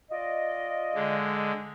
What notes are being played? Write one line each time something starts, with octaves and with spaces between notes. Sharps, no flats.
F4 D5 D#5
D3 G#3